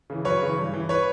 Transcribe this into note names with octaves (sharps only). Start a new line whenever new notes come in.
C#3 E3
F#2 B4 C#5
C#3 E3
G2
E3
B4 C#5